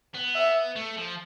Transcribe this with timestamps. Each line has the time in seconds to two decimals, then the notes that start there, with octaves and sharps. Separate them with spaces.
0.15 B3
0.35 E5
0.76 A3
0.97 F3